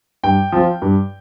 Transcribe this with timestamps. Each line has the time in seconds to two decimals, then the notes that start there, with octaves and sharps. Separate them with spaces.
0.23 G2 G5
0.52 F3 C4 F4
0.82 G2